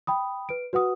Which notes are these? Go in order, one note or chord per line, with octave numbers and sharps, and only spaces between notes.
G5 B5 D#6
B4 D7
F#4 B4 F#5 D#6